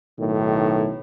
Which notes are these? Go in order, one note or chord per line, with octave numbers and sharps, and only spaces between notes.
B1 A2 D#3